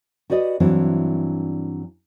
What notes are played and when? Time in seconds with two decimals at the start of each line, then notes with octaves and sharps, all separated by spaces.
0.30 F#4 G4 B4 D5 D#5
0.60 G2 E3 F#3 C4 D4 E4